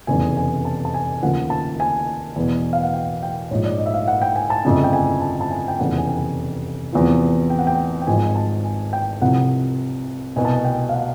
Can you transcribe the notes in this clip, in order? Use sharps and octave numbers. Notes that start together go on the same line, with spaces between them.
F1 E2 C#3 G#5
G#5
A5
A5
G#5
D#2 C#3 F3 F#5
A5
G#5
E2 B2
F5
F#5
G5
G5
A#1 G#2 F3 C#5
D5
D#5
E5
F5
F#5
G5
G#5
A5
G1 F2 C#3 G#5
G5
G#5
A5
A5
G#5
G5
F1 E2 C#3 F3 F#5
G#5
G5
E2 C3 F3
G5
F#5
G5
G5
G#1 G#2 F3 G#5
A5
G#5
G5
C2 C3 F3 F#5
C2 B2 G#5
A5
G#5
G5
F5
F#5